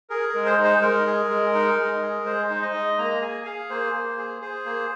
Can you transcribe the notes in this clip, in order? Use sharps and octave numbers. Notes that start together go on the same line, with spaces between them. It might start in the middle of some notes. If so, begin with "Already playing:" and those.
G#4 A#4
A#4
G#3
C5
D#4
C5
G#3 A#4
G#4
G#3
D#4
G#3
G#4
G#3 C5
D#4
D#5
G#3
A#3 A#5
G#4 G#5
G#4 F5
A#3 C5
A#3
G#4
G#4 C5
A#3